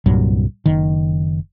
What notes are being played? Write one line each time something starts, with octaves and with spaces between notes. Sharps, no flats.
C2 G2 A#2 F#3
F#1 D#3